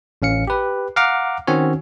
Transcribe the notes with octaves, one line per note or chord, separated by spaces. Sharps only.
A1 C#4 F5 C#7
G4 B4
F5 F#5 A#5 D6 F6
D#3 C4 C#4 F#4 C#5